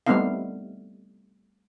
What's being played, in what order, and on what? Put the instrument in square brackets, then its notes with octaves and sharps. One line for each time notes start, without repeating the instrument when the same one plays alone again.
[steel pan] G3 A3 B3 C4 D#4 F5